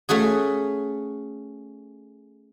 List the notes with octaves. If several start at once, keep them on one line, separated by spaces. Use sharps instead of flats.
A3 C#4 F#4 G#4